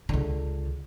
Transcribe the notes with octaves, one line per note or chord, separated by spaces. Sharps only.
C#2 D3